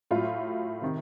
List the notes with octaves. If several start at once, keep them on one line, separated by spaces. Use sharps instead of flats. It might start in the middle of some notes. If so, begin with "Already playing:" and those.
A2 F#3 F4
C3 D#3